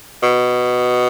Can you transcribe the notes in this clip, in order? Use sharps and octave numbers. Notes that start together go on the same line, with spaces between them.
B2